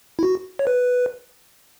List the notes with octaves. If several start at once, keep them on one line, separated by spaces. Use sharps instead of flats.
E4
F#4
C#5
B4